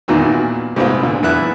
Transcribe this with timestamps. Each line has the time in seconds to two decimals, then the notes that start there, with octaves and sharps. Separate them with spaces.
0.08 E2 A#2 D#3 E3 F#3
0.76 G#2 C3 A3 B3 C4 F4
1.03 A#2 D3
1.23 E2 B3 E4 F#6